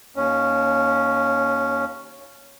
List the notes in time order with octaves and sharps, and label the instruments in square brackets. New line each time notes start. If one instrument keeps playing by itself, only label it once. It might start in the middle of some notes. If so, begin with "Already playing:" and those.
[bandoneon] D#2 C#4